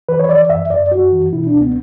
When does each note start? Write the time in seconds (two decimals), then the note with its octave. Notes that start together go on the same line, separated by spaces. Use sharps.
0.09 E3 B4
0.20 C#5
0.29 E3 D5
0.50 F#2 E5
0.70 F#2 D5
0.91 F#2 F#4
1.12 E3
1.33 B2 E4
1.47 D4
1.55 C#2
1.61 B3